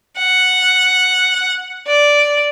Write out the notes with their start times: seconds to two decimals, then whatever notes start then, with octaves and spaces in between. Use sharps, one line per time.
0.18 F#5
1.87 D5